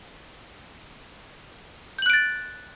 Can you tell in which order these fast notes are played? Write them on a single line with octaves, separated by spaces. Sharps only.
G6 F#7 F#6 D7 A6